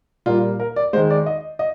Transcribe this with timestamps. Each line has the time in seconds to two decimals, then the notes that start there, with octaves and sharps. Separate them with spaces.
0.26 A#2 G3 A#3 F4
0.60 A#4
0.76 D5
0.93 G#3 C5
0.97 D#3
1.10 D5
1.26 D#5
1.59 D#5